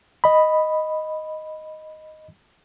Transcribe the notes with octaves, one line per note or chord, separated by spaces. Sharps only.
D#5 B5